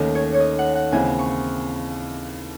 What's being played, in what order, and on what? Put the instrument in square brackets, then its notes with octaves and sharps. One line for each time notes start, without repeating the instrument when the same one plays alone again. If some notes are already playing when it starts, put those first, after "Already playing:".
Already playing: [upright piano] D#2 D#3 A3 C#4
[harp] C#5
C#5
D#5
F#5
F#5
[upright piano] D#2 C#3 E3 C4 E4 [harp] G#5
[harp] C#6